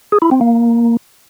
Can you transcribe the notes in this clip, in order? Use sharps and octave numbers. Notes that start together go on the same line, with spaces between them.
G#4
E4
C4
A#3